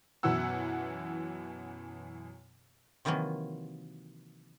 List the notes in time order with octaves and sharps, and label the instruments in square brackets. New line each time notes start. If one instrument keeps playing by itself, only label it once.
[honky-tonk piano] F#2 B2 E3 E4 F#5 E6
[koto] C3 D#3 E3 F#3 A#3